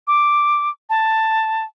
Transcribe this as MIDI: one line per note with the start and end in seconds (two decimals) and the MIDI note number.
0.07 0.70 86
0.90 1.63 81